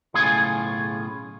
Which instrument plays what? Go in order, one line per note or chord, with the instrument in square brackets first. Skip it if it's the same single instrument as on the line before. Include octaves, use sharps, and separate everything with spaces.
[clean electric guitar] B1 A2 C#3 F4 G#4 G#5